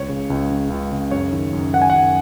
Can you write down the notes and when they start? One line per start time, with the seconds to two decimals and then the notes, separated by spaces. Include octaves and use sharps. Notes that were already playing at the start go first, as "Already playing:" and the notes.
Already playing: C#2 C#5
0.09 C#3
0.30 C#2
0.51 C#3
0.70 C#2
0.92 C#3
1.11 F#2 C#5
1.32 D#3
1.53 F#2
1.73 D#3 F#5
1.82 G#5
1.90 F#2 F#5